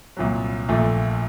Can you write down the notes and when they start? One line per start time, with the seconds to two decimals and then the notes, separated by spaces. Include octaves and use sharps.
0.17 C2 A#2 F#3
0.69 A#1 A#2 A3